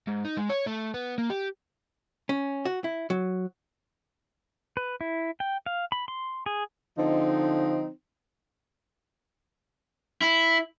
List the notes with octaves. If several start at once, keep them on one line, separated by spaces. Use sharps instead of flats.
G#2
D#4
G#3
C#5
A3
B3
A#3
G4
C#4
F#4
E4
F#3
B4
E4
G5
F5
B5
C6
G#4
D3 F3 C4 D#4
E4